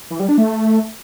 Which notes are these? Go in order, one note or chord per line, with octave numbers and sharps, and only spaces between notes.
E3
G3
D4
A3